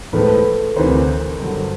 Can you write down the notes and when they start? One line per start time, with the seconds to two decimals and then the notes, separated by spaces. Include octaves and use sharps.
0.13 A2 F3 G#3 A4 B4
0.77 D2 C3 E3 A#4 C5
1.40 G2 D3 F#3